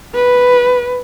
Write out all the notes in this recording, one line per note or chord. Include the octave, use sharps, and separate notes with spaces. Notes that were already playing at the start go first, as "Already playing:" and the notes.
B4